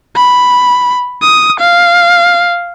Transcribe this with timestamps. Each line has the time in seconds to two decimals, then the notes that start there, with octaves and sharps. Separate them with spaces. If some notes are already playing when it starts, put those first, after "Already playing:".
0.16 B5
1.22 D#6
1.60 F5